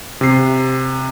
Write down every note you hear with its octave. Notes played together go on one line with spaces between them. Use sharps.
C3 C7